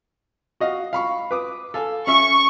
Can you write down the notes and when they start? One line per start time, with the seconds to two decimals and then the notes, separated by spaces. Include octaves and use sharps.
0.60 F#4 D#5 F5
0.93 F5 B5 C#6
1.31 B4 D6 D#6
1.74 A4 F5 G#5
2.07 C#4 E5 C#6